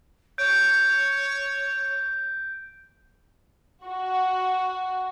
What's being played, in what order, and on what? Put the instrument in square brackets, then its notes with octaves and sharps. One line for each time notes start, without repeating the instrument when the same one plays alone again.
[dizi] C#5 [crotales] G6 D7
[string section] F#4